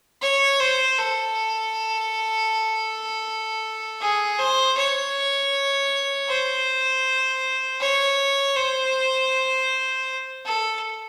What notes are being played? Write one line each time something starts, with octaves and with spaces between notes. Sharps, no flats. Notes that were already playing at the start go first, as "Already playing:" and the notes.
C#5
C5
A4
G#4
C5
C#5
C5
C#5
C5
A4